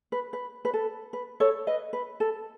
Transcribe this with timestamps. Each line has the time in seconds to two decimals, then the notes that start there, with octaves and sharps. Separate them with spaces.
0.12 B4
0.33 B4
0.65 B4
0.73 A4
1.13 B4
1.40 A4 C#5
1.67 B4 D#5
1.93 B4
2.20 A4